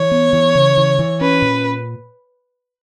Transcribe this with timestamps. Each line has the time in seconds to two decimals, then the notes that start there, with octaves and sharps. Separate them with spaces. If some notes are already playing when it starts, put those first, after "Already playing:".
Already playing: E3 C#5
0.11 B3
0.33 E3
0.55 C#3
0.77 E3
0.99 E3
1.21 C#4 B4
1.42 A#2